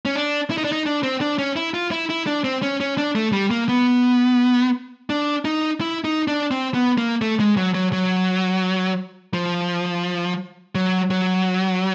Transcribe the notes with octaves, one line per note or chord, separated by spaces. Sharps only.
C#4
D4
E4
D#4
D4
D#4
D4
C4
D4
C#4
E4
F4
E4
E4
D4
C4
C#4
C#4
D4
A3
G3
A#3
B3
D4
D#4
E4
D#4
D4
C4
B3
A#3
A3
G#3
F#3
F#3
F#3
F3
F#3
F#3